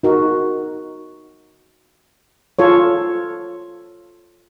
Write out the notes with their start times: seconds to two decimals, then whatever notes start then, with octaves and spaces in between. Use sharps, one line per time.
0.03 D#4 F#4 A#4
2.59 F4 A4 C#5